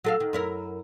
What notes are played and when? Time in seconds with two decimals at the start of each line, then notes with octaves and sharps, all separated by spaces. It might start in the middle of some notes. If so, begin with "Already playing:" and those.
0.04 F#3 A4 F5
0.20 D#3
0.33 F#2 E4 A#4